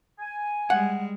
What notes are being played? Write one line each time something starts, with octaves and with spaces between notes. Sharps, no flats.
G#5
G3 G#3 F#5